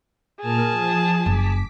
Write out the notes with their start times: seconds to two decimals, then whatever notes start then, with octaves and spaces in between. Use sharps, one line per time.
0.40 A#2 G#4 A#4 A5 F6
0.69 F3
1.26 F#1 D6 B6